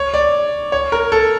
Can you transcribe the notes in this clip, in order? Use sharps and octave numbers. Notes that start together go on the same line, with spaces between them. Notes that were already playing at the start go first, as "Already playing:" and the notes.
Already playing: C#5
D5
C#5
A#4
A4